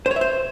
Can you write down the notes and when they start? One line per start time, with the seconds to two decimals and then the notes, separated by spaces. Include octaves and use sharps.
0.06 C5
0.11 C#5
0.16 E5
0.21 C5